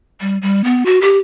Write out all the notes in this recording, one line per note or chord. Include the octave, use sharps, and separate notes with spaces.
G3
G3
B3
F#4
G4